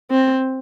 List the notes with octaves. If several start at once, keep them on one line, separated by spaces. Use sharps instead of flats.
C4